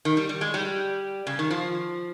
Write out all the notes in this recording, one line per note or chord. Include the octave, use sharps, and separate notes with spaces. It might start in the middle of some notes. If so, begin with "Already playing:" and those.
D#3
G3
G3
G#3
G3
C#3
D#3
F3